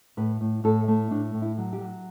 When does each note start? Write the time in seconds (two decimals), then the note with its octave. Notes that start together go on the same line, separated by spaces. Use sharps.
0.17 A2 B4
0.41 A2
0.64 A2 A4
0.88 A3
1.11 A2 D4
1.34 A2
1.42 E4
1.58 F#3
1.73 G4
1.81 F#3